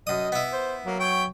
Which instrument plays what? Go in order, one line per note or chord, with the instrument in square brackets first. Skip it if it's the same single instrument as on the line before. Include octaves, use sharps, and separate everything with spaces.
[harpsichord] F#2 D#6 [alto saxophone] D#5
[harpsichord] B3 E4
[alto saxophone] C5
[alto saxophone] F#3 [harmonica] A#3
[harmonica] C#5 G5